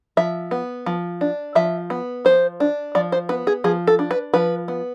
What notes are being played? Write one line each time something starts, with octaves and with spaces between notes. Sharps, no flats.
F3 E5
B3
F3
D4
F3 E5
B3
F3 C5
D4
F3 D5
C5
B3 B4
G#4
F3 G#4
A4
D4
B4
F3 B4
B3